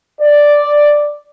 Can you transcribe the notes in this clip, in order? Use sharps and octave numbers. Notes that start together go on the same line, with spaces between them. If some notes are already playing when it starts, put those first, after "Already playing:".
D5